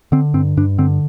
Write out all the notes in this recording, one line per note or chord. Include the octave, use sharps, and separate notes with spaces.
D3 C4
G2 C4
G2 D4
D3 C4